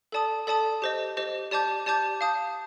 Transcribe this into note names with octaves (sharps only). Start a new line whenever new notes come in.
A4 D5 A5 D#6
A4 D5 A5 D#6
G4 C5 D#5
G4 C5 D#5
G4 D5 A5 D6 G6
G4 D5 A5 D6 G6
F5 A5 D#6 G6